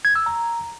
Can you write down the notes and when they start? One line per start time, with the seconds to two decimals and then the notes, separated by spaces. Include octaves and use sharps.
0.05 G#6
0.15 E6
0.26 A#5